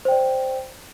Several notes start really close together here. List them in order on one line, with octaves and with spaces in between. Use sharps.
C5 G5 D5